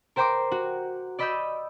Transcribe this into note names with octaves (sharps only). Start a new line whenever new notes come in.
A#4 C5 G5 A#5 C6 D6
F#4
D5 D#5 B5 D#6 E6 G6